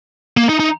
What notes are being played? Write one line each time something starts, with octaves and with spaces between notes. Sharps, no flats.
A#3
D#4
D#4